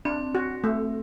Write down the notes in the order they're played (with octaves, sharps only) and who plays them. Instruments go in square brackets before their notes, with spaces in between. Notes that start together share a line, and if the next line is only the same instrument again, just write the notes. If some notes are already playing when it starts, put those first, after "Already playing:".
[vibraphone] C4 [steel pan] D4
[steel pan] F#4
A3